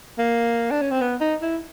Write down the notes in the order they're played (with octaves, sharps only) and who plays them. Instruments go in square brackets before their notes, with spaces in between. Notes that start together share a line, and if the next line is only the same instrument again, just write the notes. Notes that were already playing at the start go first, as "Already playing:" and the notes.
[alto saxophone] A#3
D4
C#4
C4
B3
D#4
E4